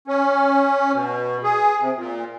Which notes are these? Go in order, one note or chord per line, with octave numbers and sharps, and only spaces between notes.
C#4
B2
G#4
C3
A#2